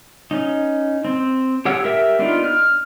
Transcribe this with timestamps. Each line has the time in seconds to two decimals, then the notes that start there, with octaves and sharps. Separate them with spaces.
0.31 C#4 D#4
1.05 C4
1.65 G4 C#5 F#5 E6
1.84 G4 A#4 E5 G5 E6
2.19 B3 D4 D#4 F4
2.44 F6